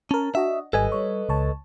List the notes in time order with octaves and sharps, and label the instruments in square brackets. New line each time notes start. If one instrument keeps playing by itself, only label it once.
[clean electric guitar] C#4 [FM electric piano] A#4 A5
[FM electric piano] D4 F#4 D#5 [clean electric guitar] E5
[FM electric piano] G#1 G3 G#5 [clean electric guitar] A4 B4 D#5
[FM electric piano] G3 C#5
C#2 C#5 A5